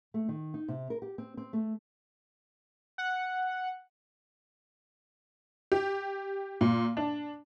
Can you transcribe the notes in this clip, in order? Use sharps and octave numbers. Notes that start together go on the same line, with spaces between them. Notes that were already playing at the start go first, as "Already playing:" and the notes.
A3
D#3
D#4
C3
A#4
G4
C4
C4
A3
F#5
G4
A#2
D4